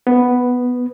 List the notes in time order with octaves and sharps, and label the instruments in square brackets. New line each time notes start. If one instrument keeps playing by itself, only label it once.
[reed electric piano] B3